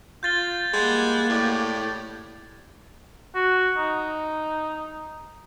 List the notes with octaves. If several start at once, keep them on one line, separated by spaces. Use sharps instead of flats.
F4 G6 A6 G7
G3 G#3 A#3 F#5 G#6
A2 G4 D5
F#4
D#4